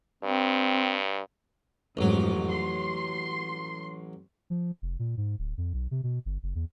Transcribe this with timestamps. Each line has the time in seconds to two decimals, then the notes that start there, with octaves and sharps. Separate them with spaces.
0.23 G2 C4
1.97 A1 F2 G#2 F#3
2.50 C6
4.50 F3
4.82 F1
4.99 A#2
5.17 G#2
5.39 D1
5.58 F2
5.73 B1
5.91 C3
6.03 B2
6.25 G1
6.43 F#1
6.55 E2